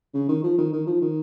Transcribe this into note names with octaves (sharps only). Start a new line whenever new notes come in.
C#3
D#3
F3
D#3
D#3
F3
D#3